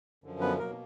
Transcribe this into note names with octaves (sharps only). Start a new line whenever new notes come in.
F#2 D3 F3
B3 B4
B2 F#3 A#3 A#4